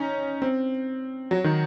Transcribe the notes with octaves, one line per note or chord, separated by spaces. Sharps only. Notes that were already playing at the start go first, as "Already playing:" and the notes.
Already playing: C#4 D#4
C4
F#3
D#3